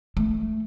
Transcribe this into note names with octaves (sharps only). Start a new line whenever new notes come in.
A3